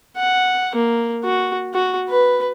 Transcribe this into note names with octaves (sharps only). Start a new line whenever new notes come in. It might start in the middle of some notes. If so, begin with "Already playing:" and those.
F#5
A#3
F#4
F#4
B4